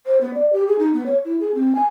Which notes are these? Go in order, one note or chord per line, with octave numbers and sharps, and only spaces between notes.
C5
B3
D5
G4
G#4
D#4
B3
C#5
E4
G#4
C4
G#5